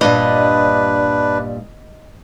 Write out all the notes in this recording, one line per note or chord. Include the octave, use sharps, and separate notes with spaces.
G2 A#2 G3 D4 B4 D#5